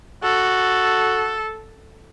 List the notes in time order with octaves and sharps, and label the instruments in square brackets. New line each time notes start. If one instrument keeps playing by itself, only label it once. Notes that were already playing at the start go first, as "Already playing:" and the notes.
[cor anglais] F#4 [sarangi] A4